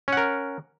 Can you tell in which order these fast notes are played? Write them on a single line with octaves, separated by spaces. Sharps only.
C#4 F#5 A#4